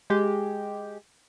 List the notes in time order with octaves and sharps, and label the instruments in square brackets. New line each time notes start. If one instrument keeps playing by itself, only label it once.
[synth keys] G#3 G4